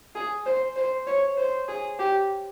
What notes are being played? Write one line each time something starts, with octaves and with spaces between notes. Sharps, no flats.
G#4
C5
C5
C#5
C5
G#4
G4